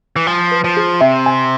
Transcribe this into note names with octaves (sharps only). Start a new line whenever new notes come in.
E3
F3 G#5
B4
F3
G#4
C3 E5
G#5